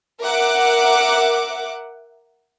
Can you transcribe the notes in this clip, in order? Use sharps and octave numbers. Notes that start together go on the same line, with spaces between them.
A#4 E5 F#5 D6